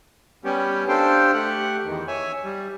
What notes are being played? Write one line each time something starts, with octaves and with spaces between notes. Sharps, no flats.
G3 B3 C#4 G4
D4 G4 A4 C5 F5 G5
A3 G4 F#5
E2 D#3
C#5 E5 G#5
G3